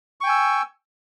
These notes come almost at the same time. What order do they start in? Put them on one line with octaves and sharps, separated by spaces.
C#6 G5 G#5 E6